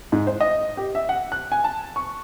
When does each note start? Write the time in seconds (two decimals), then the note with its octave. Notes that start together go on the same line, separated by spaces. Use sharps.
0.12 G#2
0.27 C5
0.40 D#5
0.77 G4
0.95 E5
1.09 F#5
1.32 F#6
1.52 G#5
1.64 A5
1.96 C#6